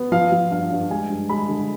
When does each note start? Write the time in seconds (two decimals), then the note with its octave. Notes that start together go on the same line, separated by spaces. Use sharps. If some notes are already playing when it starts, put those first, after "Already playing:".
Already playing: B3
0.12 F3 F5
0.32 F3
0.51 G2 F5
0.72 G2
0.91 G#3 G#5
1.10 G2
1.29 G#3 B5
1.49 D3